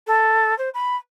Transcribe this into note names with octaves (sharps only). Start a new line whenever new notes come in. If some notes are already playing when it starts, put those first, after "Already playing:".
A4
C5
B5